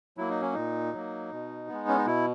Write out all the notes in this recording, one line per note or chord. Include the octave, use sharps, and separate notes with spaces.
F#3 A#3 E4
D#4
C#4
A#2 D#4
F#3 A#3
B2
G#3 B3
C#4
D#4
B2 E4